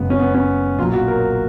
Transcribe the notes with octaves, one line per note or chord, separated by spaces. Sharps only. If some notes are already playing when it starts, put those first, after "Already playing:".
Already playing: F#1 F#2 C#3 G#3 B3
C#4
B3
C#4
B1 A#2 F#3 F4
F#4
A#4